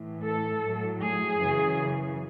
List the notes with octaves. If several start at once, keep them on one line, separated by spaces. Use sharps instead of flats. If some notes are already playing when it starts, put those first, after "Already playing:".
Already playing: A2 E3
A4
A2 F#3
G#4
F#2 C#3 E3